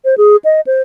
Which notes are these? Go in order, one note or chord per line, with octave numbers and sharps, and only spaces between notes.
C5
G#4
D#5
C5